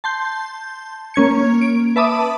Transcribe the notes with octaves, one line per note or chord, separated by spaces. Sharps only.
A5 C6 G6
A#3 C#4 G#6 C#7
D7
B4 E5 A5 B5 D6 D#6